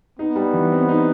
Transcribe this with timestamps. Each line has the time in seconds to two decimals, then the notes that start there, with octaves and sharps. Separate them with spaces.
0.19 B3 D#4
0.36 G3
0.53 E3
0.72 C4
0.89 D#4